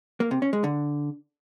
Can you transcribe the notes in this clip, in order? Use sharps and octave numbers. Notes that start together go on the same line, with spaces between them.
A#3
C3
C#4
G#3
D3